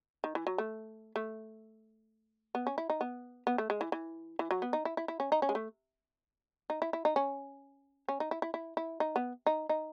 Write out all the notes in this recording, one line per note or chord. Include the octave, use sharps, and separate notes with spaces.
D#3
E3
F#3
A3
A3
B3
C#4
E4
D#4
B3
B3
A3
G#3
E3
E3
E3
F#3
B3
D#4
E4
E4
E4
C#4
D#4
C#4
G#3
A3
D#4
E4
E4
D#4
C#4
C#4
D#4
E4
E4
E4
E4
D#4
B3
D#4
D#4